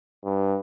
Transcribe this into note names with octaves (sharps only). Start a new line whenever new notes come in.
G2